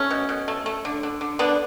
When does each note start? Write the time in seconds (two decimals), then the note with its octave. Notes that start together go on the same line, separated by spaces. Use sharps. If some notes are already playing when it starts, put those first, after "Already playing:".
Already playing: A3 C#4
0.11 B2
0.29 B2
0.48 A3
0.66 A3
0.85 D3
1.03 D3
1.21 D3
1.39 D3 B3 D4